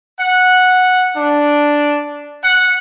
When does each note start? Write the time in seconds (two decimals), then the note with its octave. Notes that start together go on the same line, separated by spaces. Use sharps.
0.19 F#5
1.16 D4
2.43 F#5